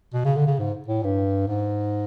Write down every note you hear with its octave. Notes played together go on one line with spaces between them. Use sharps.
B2
C#3
D3
C#3
G#2
A2
G2
G#2